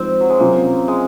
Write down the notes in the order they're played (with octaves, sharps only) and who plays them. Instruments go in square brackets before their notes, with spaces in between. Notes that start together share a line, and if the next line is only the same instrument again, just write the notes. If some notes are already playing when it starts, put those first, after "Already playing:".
Already playing: [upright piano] F3 G#3 D#4 [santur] C4
[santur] F#3
G#3
[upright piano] C3 F#3 C#4 F4 [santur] A#3
[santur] G#3